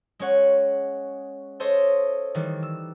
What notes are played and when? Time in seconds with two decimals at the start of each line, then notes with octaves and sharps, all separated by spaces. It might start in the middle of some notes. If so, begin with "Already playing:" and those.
0.19 G#3 C#4 C#5 F#5
1.60 A4 C5 C#5 D#5
2.35 D#3 E3 G3
2.63 E6